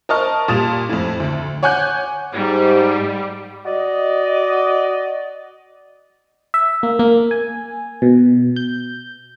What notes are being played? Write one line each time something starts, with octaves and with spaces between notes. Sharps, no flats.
A#4 C5 D#5 A5 C#6 F6
A#2 G3 D#6 A6 E7 F7
F2 A2
D2
C#5 F#5 G#5 D6 F#6 G6
G#2 G3
F#4 D5 D#5
E5
A#3
A#3
G#5
B2
G6